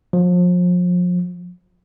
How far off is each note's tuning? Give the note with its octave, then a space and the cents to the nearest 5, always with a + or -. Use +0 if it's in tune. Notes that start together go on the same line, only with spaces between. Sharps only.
F3 +35